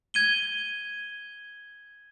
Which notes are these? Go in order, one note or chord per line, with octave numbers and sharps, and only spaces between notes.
G#6 D#7 G7